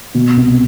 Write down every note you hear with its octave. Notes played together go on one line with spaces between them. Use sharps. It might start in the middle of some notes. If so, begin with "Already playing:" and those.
B2
C2